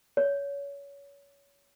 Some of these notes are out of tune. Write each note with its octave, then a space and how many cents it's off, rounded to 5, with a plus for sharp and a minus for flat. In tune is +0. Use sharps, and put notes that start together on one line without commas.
C#5 +25